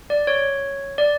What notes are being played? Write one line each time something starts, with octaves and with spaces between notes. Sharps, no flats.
D5
C#5
D5